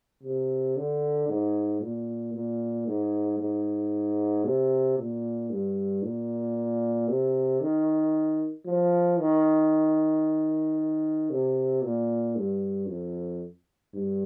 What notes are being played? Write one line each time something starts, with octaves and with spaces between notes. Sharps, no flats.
C3
D3
G#2
A#2
A#2
G#2
G#2
C3
A#2
G2
A#2
C3
D#3
F3
D#3
C3
A#2
G2
F2
G2